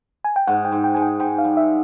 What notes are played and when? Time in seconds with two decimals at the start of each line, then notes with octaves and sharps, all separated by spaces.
0.24 G#5
0.36 G5
0.47 G#2 F#5
0.65 G5
0.72 G#2
0.84 G5
0.94 G#2 G#5
1.02 G5
1.20 G#2 G5
1.38 F5
1.44 G3
1.57 E5